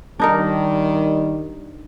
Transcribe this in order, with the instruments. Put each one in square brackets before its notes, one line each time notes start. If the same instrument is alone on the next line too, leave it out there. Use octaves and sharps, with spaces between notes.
[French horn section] D#3 G3 [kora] D4 D#4 A#4